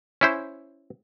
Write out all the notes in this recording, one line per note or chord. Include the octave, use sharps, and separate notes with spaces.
C#4 E4 C5